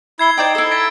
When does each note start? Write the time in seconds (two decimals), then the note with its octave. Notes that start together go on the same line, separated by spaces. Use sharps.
0.19 E4 G#6 C7 G7
0.37 D#4 C5 D5 G5
0.55 E4 A4
0.71 A6 B6 D7